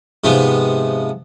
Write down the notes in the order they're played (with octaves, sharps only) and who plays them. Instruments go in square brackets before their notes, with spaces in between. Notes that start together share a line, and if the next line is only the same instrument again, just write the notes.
[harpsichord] G#2 C3 F3 B3